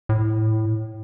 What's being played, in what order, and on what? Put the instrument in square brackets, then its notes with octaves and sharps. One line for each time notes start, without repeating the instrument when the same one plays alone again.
[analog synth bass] A2